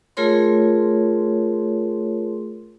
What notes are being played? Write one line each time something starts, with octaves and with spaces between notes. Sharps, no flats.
A3 F4 G#4 A#4 C#5 C6